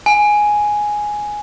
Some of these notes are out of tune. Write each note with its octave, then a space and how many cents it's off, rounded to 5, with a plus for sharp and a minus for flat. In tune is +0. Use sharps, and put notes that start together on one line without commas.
G#5 +5